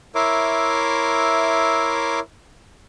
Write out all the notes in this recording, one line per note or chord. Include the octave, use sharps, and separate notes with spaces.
E4 A#4 C#5 E5 C6 D6